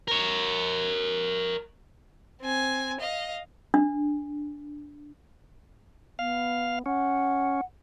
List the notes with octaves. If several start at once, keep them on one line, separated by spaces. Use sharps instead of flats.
A#4 C#5
C4 G#5
D#5 F5
D4
B3 F5
C#4 F#5